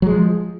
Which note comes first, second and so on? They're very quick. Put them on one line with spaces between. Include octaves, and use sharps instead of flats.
F#3 G#3 F3